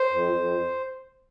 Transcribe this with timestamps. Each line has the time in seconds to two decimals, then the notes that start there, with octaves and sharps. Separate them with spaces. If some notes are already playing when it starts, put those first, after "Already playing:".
Already playing: C5
0.12 F2
0.33 F2